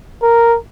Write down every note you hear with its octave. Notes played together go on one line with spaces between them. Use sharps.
A#4